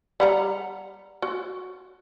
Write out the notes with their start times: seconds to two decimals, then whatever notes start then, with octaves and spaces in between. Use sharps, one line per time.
0.20 G3 F#5 A#5
1.22 F#4